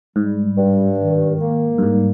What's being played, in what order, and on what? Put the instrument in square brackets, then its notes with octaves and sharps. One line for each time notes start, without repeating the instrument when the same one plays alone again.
[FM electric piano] G#2 [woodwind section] G3
[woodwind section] G2
D#3
A#3
[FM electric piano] G2
[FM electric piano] G#2 [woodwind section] G3